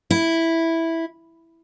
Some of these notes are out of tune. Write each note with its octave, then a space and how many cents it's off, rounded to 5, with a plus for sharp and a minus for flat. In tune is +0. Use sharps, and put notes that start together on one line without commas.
E4 -5